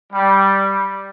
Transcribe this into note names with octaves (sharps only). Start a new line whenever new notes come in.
G3